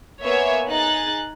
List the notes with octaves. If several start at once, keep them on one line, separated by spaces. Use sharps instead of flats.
A#3 B3 C#5 E5 G#5
D#4 G#4 F#6 A6